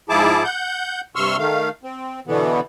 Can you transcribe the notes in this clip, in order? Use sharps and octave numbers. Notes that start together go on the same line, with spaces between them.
G#2 F3 E4 G#4 A5 D6
F#5 G6
G2 C3 C6 C#6 E6 F6
D#3 A3 F5
C4
B2 D3 E3 B3